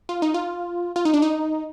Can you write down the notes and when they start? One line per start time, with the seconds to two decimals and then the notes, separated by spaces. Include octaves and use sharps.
0.09 F4
0.22 D#4
0.34 F4
0.96 F4
1.05 D#4
1.14 D4
1.22 D#4